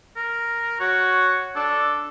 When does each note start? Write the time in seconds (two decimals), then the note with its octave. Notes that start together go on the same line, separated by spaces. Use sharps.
0.16 A#4
0.80 F#4 C#5
1.56 D4 A4